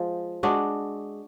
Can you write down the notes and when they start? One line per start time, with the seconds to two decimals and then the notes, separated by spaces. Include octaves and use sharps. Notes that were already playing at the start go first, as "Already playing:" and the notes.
Already playing: F3 G#3
0.43 G#3 D4 F#4